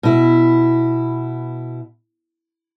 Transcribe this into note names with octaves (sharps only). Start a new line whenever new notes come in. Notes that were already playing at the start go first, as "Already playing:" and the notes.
B2 E4